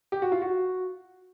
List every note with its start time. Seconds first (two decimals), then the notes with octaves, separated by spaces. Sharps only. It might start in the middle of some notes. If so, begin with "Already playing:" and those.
0.12 G4
0.22 F#4
0.32 F4
0.42 F#4